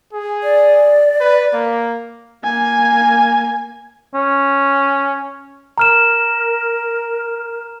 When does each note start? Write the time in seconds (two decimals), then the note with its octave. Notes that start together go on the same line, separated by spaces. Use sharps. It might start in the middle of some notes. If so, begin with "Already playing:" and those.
0.13 G#4
0.43 D5
1.20 B4
1.53 A#3
2.44 A#3 G#5
4.14 C#4
5.78 A#4 A#5 F6 E7